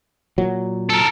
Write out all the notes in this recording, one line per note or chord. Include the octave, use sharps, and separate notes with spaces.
A#2 F#3
A4 A#4